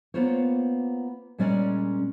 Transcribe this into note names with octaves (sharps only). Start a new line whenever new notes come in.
A#3 B3 F4 C5 C#5
A#2 G3 G#3 C#4 D5 D#5